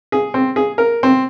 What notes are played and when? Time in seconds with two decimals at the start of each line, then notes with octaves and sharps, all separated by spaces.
0.12 G#4
0.34 C4
0.56 G#4
0.78 A#4
1.03 C4